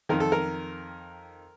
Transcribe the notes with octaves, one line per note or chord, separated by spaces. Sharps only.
F2 D#3 A#4
A4
A#4